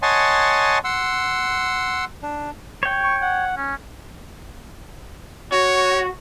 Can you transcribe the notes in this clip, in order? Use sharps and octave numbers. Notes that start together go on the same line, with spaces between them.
C#5 D#5 F#5 G#5 A5 C6
F#5 C6 E6
D4
C#5 G5
C#6
F#5
C#4
F#4 C#5